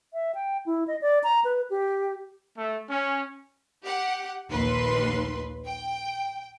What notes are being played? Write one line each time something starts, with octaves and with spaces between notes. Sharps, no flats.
E5
G5
E4
D#5
D5
A#5
B4
G4
A3
C#4
G4 F#5
A#1 D#2 B4 C6
G5